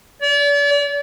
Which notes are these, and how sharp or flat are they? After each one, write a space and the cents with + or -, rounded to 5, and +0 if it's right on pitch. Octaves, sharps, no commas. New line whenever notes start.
D5 -40